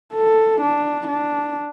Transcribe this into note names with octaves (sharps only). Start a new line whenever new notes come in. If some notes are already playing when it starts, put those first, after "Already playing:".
A4
D4
D4